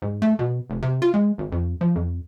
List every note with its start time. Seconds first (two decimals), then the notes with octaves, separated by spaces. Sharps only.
0.02 G#2
0.22 A3
0.39 B2
0.70 F1
0.82 C3
1.02 F4
1.14 G#3
1.38 G#1
1.52 F2
1.81 F3
1.96 F2